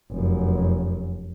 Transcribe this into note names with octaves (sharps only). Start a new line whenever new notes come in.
F1 F#2